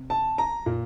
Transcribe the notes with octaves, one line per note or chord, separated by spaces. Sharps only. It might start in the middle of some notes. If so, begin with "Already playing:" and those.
Already playing: C3
A5
A#5
A#2